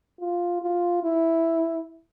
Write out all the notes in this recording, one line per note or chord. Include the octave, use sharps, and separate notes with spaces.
F4
F4
E4